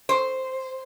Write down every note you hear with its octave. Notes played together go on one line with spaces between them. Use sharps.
C5